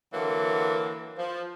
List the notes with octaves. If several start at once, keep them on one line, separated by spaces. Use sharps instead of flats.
D3 E3 F#3 A#3
F3